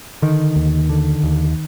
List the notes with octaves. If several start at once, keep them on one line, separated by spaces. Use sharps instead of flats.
D3 D#3
D#2
D3
D#2